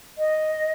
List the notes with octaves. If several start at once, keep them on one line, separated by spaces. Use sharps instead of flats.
D#5